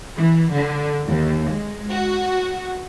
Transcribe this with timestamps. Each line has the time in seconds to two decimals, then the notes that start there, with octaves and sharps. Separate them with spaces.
0.17 E3
0.51 D3
1.05 D#2
1.48 G#3
1.91 F#4